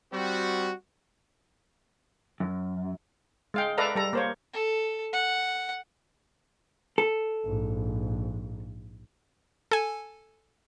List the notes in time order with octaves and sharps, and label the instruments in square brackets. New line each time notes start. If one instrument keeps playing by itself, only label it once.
[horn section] G3 C4 F#4
[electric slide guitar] F#2
[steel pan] G#3 F5 G5
A4 B4 D5 E5 F5 A#5
G3 A4 A#5
A#3 C5 C#5
[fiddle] A4
F#5
[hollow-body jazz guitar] A4
[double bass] A#1 G#2
[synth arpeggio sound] A4 G#5